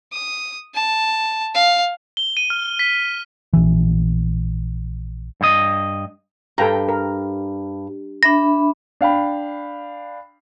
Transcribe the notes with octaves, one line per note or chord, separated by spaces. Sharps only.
D#6
A5
F5
G7
D#7
F6
B6
A#1 E3
G2 D#5
G2 A4 G5 A#5
A#4
D4 E5 B5 A#6
D4 F5 G5 B5